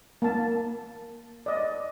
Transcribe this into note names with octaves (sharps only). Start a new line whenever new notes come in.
A#3 A5
D5 D#5